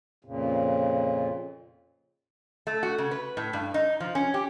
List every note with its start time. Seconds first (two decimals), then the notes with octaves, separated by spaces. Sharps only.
0.25 F2 A#2 C#3
2.67 A3
2.83 F#4
2.98 C#3
3.11 B4
3.37 A2
3.53 G2
3.74 D#4
4.00 F3
4.15 C#4
4.34 G4